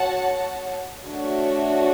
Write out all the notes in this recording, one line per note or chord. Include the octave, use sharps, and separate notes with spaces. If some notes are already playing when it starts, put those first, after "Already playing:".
Already playing: F#4 C#5 F#5 A5
A3 D4 F#4 C#5